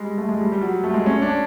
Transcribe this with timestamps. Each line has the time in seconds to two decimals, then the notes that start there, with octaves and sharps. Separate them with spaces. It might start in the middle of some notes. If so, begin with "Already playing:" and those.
Already playing: G3 G#3
0.18 A3
0.29 G#3
0.41 G3
0.52 G3
0.61 F#3
0.84 A3
0.94 G#3
1.06 C#4
1.22 D4